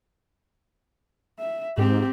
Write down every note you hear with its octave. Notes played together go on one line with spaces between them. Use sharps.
E5
G#2 C4 G4